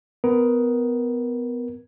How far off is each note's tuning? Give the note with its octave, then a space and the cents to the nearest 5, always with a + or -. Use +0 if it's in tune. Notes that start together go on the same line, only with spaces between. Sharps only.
B3 +20 A#4 +20